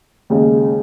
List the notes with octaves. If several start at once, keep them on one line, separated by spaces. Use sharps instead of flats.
D#2 C#3 G#3